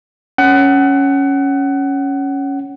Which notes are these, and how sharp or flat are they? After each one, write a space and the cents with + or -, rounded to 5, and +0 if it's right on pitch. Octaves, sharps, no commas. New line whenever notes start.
C#4 +0 F#5 +25